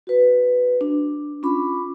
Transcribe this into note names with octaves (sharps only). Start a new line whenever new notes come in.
F#4 B4
D4
C#4 F4 B5 D6